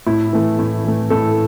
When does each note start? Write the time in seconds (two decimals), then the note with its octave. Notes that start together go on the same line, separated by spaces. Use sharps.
0.06 A2 E4
0.33 E3 A3
0.59 A2
0.85 E3 A3
1.10 A2 A4